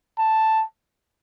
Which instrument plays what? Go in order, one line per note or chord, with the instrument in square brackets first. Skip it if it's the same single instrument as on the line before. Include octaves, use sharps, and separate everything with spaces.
[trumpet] A5